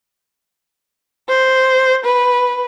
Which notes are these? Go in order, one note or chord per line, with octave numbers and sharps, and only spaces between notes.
C5
B4